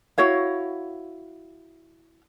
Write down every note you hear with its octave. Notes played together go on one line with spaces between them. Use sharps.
E4 F#4 C#5 F5